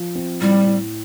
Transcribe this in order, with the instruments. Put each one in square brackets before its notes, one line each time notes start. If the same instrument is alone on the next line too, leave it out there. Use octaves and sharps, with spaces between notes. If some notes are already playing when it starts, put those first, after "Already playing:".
Already playing: [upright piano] F3
C4
[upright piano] A2 [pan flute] G3
[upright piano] A2